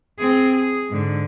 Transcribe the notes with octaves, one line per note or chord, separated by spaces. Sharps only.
C4 G#4
G#4
G#2 D3